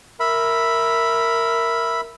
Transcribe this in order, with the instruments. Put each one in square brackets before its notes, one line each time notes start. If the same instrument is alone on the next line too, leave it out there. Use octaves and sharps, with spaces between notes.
[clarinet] A#4 [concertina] E5 B5